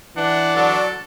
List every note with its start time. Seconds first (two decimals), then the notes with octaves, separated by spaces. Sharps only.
0.17 E3 D4 F#5
0.55 D3 F#3 A4